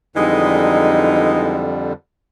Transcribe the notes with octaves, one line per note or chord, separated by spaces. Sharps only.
F2 D3 E3 G3 G#3 D#4